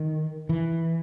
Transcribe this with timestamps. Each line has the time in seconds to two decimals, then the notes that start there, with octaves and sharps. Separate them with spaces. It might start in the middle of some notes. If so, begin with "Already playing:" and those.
Already playing: D#3
0.49 E3